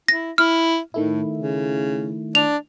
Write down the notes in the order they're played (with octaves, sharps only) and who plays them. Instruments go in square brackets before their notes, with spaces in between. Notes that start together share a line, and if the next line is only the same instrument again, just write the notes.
[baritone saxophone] E4 [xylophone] A#6
[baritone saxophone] E4 [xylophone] F6
[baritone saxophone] A2 [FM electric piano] D#3 A3 E4
[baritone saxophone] C#3
[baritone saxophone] D4 [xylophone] F7